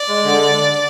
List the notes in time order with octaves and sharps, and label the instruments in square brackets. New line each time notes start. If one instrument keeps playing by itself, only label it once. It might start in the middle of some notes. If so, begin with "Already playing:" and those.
Already playing: [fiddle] D5
[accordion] G#3
D3